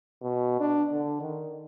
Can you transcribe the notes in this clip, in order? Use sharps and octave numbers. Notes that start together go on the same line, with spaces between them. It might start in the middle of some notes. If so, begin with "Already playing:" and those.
B2
D4
D3
D#3